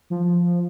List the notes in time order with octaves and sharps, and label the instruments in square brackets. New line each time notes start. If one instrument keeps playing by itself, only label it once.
[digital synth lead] F3